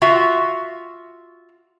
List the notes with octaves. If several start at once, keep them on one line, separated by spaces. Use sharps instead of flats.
F4 F#4 E5